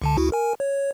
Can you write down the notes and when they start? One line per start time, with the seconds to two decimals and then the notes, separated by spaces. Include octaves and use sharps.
0.02 C#2 D3 A5
0.17 D2 E4 F#4
0.32 A#4 G#5
0.60 C#5